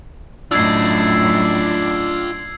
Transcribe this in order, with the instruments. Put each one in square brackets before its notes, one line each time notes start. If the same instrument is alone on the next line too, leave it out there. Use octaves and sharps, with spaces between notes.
[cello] F#2 A2 [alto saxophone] D4 [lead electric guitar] F4 D#5 [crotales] E6 G#6 C7